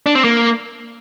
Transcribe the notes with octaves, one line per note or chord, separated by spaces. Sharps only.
D4
C4
A#3